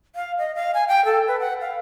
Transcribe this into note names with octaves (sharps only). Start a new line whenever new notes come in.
F5
D#5
F5
G#5
G5
A4
B4
F#5
F5